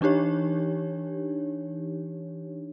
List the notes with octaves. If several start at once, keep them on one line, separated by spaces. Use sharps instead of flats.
E3 D4 D#4 G4 C#5